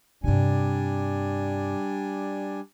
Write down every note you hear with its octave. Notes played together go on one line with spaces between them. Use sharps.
G2 C3 G3 D4 G#5